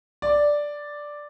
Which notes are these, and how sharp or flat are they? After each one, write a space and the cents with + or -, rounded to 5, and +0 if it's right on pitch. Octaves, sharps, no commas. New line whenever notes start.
D5 +0